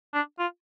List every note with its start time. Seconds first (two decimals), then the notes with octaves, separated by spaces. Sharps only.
0.14 D4
0.39 F4